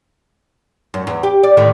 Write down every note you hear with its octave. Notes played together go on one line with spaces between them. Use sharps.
F#2
E2
G4
D5
A2 D3 D#3